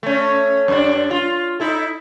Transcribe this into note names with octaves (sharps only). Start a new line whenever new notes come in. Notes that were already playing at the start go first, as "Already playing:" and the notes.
A3 C#4
F#2 D4
F4
D#4 E4 A4